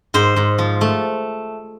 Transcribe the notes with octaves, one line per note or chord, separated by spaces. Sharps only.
G#2 C5
G#2
F3
A3